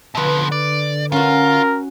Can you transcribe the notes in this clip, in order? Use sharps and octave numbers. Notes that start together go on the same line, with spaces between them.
B2 D3 F3 B4 E5
D5
C#4 F4 F#4 A#4